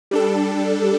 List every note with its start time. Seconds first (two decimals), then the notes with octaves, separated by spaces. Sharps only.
0.11 G3 D4 A4